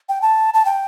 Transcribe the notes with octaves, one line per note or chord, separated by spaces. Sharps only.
G5
A5
A5
G5